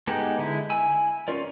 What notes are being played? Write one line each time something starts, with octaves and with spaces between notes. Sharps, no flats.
G#3 B3 D#4 G4 A4
D3 G#3 E4
E4 G#5 E6
C#4 F4 A#4 D5